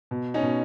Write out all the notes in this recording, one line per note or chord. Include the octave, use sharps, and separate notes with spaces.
B2
C#4 D#4
B2